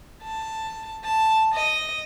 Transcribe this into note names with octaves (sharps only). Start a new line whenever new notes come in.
A5
A5
D#5